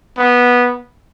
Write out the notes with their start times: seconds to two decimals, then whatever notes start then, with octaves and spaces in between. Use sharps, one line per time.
0.18 B3